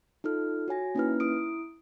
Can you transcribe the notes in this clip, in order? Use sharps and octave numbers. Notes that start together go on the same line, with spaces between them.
D#4 F4 A4 F6
F#4 C#5 G#5 A#6
A#3 C#4 D#4 E4 B4 F6
E4 D#6 D7